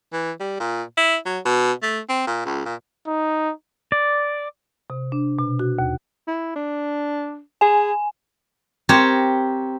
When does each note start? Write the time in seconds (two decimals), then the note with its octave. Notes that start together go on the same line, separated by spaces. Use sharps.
0.13 E3
0.40 G3
0.60 A#2
0.97 E4
1.26 F#3
1.45 B2
1.83 A3
2.09 C4
2.27 A#2
2.45 C#2
2.66 A#2
3.07 D#4
3.92 D5
4.90 C3
5.12 D4
5.39 B2
5.59 F#4
5.79 D#2
6.27 E4
6.56 D4
7.61 G#4 G#5
8.89 C4 G4 A#4 C#5